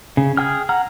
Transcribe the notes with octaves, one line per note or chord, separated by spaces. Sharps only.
C#3
G#4 G5 F6
F#5 A#5 F6